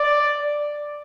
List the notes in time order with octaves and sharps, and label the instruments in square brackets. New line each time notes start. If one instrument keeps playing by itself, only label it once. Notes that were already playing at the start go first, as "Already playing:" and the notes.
Already playing: [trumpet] D5